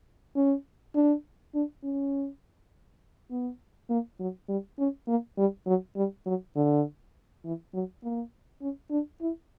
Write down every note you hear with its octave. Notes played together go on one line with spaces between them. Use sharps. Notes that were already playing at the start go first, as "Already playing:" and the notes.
C#4
D4
D4
C#4
B3
A#3
F#3
G3
C#4
A#3
G3
F#3
G3
F#3
D3
E3
F#3
A#3
C#4
D4
E4